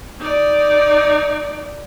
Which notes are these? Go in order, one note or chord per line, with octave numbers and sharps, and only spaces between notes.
D#4 D5